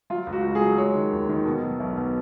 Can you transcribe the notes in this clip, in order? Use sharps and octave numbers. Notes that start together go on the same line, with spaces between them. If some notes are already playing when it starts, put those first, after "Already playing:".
F#3 F4
C#2
F#4
C#2
G#4
F#3
G#3 C#5
D#3
D#2
D#3
B2
F#3
B1
B2